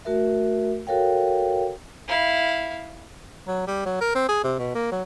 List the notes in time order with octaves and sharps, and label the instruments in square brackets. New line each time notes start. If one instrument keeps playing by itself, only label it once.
[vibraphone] A3 F#4 A#4 E5
F#4 A4 A#4 C#5 F5 G5
[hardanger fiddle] E4 F5
[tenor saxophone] F#3
G3
F#3
A#4
C4
G#4
C3
B2
A#3
F#3